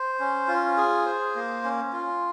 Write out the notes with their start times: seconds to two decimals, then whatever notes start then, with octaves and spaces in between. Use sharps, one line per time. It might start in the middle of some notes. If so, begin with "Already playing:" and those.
Already playing: C5
0.20 C#4
0.48 F4
0.77 G#4
1.06 C5
1.35 A#3
1.64 C#4
1.93 F4